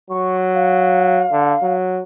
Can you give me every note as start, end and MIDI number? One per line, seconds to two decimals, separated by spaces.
0.10 1.26 54
0.10 0.37 85
0.55 1.74 77
1.32 1.54 50
1.63 2.02 54